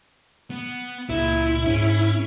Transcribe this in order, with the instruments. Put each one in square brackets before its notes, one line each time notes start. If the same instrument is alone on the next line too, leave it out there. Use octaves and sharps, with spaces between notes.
[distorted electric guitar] B3
[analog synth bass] C#2 [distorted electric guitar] A#2 [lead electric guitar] E4
[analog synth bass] G#2 [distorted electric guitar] C#4